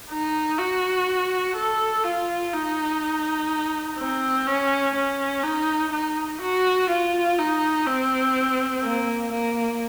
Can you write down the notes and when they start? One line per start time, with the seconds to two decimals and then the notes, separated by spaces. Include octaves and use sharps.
0.10 D#4
0.58 F#4
1.56 A4
2.04 F4
2.53 D#4
3.98 C4
4.47 C#4
4.96 C#4
5.43 D#4
5.92 D#4
6.42 F#4
6.89 F4
7.39 D#4
7.87 C4
8.83 A#3
9.32 A#3